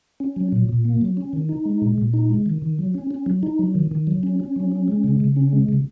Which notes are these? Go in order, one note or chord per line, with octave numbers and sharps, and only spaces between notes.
C#4
F#3
A#2
A#2
A#3
F#3
C#4
D#3
D#4
G#3
A#2
A#2
D#4
G#3
D#3
D#3
F#3
C#4
C#4
F#3
D#4
F#3
D#3
D#3
F#3
C#4
C#4
F#3
C#4
G#3
C#3
C#3
C#4
G#3
C#3